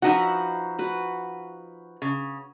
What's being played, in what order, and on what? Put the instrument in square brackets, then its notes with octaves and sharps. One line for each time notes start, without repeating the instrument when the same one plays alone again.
[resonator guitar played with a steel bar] F3 D#4 F#5 [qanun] F#4 B4 E5
[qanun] F#4 B4
[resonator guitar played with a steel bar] C#3